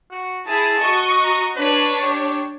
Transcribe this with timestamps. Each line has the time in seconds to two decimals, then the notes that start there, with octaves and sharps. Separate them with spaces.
0.10 F#4
0.47 E4 G#4 A5
0.79 F#4 D#5 C#6
1.24 A#5
1.57 D4 B4 C#5
2.02 G4